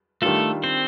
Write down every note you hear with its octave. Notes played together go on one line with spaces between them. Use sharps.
D#3 G3 A3 D4 F4 A4
C4 C5